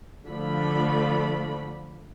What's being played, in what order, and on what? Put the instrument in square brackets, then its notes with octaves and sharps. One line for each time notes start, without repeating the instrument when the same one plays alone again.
[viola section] D3 F3 A3 B5